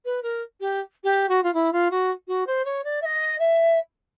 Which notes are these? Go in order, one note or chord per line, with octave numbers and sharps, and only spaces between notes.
B4
A#4
G4
G4
F#4
F4
E4
F4
F#4
F#4
C5
C#5
D5
E5
D#5
E5